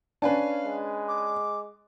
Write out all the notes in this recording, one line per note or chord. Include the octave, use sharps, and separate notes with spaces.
C#4 D4 B4 F5 G#5 A5
G#3
D6